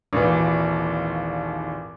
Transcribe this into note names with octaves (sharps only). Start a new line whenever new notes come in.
G#1 D#2 A#2 E3